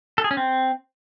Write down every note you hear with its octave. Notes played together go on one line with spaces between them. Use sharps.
A4
G#4
C#4
C4